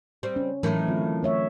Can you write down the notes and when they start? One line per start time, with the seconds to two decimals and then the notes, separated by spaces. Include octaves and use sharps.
0.23 G3 C4
0.36 C#4
0.63 A2 D#3 E3 F#3 A#4
0.88 D3 C4 F4
1.23 A3 C#5 E5